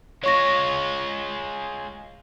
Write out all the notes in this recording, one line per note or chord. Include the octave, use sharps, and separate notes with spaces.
G#3 F4 C#5 C#6 A#6